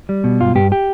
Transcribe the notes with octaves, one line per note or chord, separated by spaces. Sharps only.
G3
B2
G2 F4
G2 G4
G4